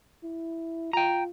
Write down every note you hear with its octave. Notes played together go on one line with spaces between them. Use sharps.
E4
F4 G5 A#5